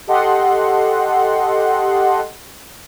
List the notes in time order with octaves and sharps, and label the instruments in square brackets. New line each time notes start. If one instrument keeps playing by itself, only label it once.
[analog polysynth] G4 A4 D#5 F#5 C6